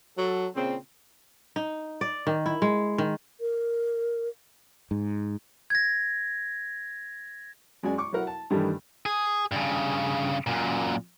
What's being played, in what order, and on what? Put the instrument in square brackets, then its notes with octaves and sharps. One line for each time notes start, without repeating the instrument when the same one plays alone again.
[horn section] F#3 A4
A#2 C#3 C4
[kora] D#4
D5
D#3
E4
G#3
D#3
[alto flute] A#4
[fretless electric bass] G#2
[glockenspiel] G#6 A#6
[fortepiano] F#2 G#3 F#4 G#4 D5 G#5
C#6 D6
F#3 E4 A#4 F#5
A5
G2 D#3 E3 G3 A3
[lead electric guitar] G#4
G2 C#3
F#2 A#2